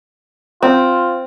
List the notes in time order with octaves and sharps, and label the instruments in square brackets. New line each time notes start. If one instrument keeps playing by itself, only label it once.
[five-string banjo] C4 [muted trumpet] F4